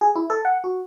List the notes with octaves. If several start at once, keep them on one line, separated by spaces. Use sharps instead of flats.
G#4
E4
A4
F#5
F#4